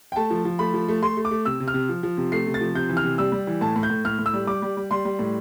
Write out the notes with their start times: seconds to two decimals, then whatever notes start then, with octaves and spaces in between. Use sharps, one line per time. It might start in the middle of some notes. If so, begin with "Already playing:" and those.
0.12 G5
0.16 A3 A5
0.30 F3
0.45 F3
0.59 A3 B5
0.74 F3
0.88 A3
1.02 A3 C6
1.17 A3
1.25 D6
1.31 A3
1.45 C3 E6
1.60 C3
1.68 F6
1.74 C3
1.89 F3
2.03 F3
2.17 C3
2.32 A3 C7
2.47 C3
2.54 A6
2.61 F3
2.75 C3 G6
2.89 E3
2.97 F6
3.04 C3
3.18 G3 E6
3.32 G3
3.47 E3
3.61 A2 A5
3.76 A2
3.83 G6
3.90 A2
4.05 A2 F6
4.19 A2
4.26 E6
4.33 G3
4.47 G3 D6
4.62 G3
4.77 G3
4.91 G3 C6
5.05 G3
5.19 A2